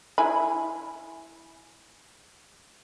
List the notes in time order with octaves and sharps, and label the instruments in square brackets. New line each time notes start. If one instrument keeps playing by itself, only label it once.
[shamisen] E4 G#5 B5